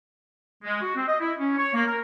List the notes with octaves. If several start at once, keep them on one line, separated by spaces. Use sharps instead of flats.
G#3
F#4
C4
D#5
E4
C#4
C#5
A#3
A#4